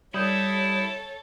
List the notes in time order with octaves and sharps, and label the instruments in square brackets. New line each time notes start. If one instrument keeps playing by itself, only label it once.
[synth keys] G3 D#6 G6 [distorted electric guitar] E4 [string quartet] A4 C#5